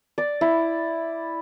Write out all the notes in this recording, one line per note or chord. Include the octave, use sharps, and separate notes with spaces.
D5
E4